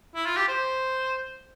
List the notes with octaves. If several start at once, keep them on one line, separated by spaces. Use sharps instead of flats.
E4
F4
G4
C5